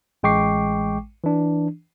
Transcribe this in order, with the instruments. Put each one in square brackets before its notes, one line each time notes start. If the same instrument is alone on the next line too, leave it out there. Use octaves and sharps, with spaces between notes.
[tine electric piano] A1 G#3 G5 C#6 D6 C7
E3 D4